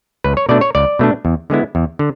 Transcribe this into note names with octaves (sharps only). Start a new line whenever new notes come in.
C#2 B4
C#5
B2 A3 D4 D5
C#5
C#2 D5
B2 A3 D4
E2
D3 G#3 B3 E4
E2
D3